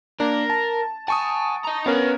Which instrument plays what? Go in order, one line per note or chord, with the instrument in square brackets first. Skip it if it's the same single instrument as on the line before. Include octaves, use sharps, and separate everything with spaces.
[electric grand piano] A#3 D4 [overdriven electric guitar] A#4
[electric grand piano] A5
[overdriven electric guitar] F#5 G#5 [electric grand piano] A5 C#6 D#6
[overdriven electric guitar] D#5 A#5
[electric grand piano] B3 C#4 A#4 [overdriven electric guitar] B4 F5